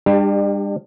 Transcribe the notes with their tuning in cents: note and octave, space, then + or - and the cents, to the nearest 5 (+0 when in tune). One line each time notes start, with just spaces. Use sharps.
G3 +40 D4 +35 G4 +0